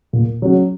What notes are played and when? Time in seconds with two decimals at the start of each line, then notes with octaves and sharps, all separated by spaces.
0.13 A#2
0.42 F#3 C#4 F#4